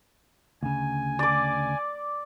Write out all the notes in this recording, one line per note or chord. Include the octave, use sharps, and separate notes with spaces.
D2 C#3 G#5
D5 D6